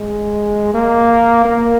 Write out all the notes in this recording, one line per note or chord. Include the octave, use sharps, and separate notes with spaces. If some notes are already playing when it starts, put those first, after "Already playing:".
Already playing: G#3
A#3
A#3